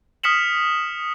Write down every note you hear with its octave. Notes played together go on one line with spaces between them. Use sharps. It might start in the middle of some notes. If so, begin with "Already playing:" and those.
D#6 F6 B6 C#7 E7 F#7